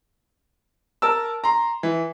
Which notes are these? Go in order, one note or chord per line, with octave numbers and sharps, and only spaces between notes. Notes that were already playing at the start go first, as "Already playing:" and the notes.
A#4 A5 E6
A#5 C6
E3